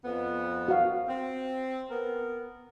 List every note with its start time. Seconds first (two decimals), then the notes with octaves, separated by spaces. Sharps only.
0.05 F2 B3
0.68 F#4 F5
1.08 C4
1.91 B3 A#4